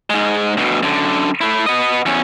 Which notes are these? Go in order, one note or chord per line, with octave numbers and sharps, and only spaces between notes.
G#2 G#3
D2 B2
F#2 D3
A3 E4
B3 D#5
E2 C#4